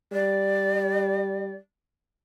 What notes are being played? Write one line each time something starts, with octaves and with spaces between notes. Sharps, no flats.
G3 D5